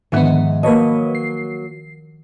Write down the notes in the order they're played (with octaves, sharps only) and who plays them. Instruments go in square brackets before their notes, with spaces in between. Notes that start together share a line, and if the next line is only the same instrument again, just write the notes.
[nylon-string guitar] G#2 E5 F#5 [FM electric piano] D3 B3 [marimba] D#3 F3
[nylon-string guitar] F#3 A#3 [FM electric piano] B4 C#5 D#5 [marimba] A5
[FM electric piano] C7